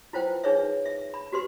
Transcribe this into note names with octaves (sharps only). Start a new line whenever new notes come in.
E4 F4 B4 C5 F#5 G5
D4 D#4 G#4 B4 C#5 E5
E5
B5
F#4 G4 B4 C6